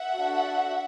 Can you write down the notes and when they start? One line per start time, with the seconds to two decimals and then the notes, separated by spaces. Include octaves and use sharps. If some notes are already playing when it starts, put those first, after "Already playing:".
Already playing: E5 F#5
0.12 D4 F#4 A4